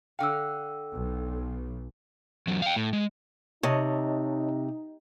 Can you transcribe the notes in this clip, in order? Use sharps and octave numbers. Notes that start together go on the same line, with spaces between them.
D3 F5 G5 E6
B1
E2 F#3
F5 G5
A2
G#3
C3 D#4 C#5 D#5 A5